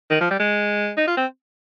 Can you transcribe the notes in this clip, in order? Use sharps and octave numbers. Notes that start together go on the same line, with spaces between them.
D#3
F3
G3
G#3
D#4
F4
C4